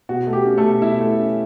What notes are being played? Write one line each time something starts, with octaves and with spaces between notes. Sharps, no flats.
B2 F#4
A3
G4
C#4
A3 A4
B2
B2 E4 E5
A3
C#4